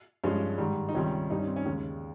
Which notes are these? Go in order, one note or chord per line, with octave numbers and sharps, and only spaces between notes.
G2 F3 G#3 C#4
G#2 D#3 G3
D#4
C#2 C3 D#3 G3 C#4
G2 G3 D#4
C#4
C4
C#4
D#2 C#3 G#3